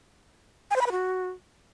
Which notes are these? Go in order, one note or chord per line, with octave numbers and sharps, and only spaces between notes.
G#5
C5
B5
B4
F#4